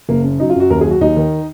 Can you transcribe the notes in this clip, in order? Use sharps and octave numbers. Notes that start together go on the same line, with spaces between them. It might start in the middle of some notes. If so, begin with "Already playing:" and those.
F#1 A#3
C#3
F#3 D#4
F4
F#2 F#4
D#2 A#4
G#4
F#3 F#4
D#2 D#4
D#3